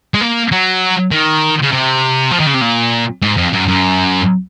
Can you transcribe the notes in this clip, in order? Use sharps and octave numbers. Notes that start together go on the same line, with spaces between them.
G#3
A#3
F#3
D#3
C#3
C3
F3
D#3
C#3
C3
A#2
G#2
F2
F#2
F#2